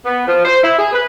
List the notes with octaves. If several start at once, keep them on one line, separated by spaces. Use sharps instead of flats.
B3
F3
C5
E4
G#4
B4